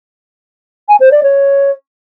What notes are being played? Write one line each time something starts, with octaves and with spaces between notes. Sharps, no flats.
G#5
C5
D5
C#5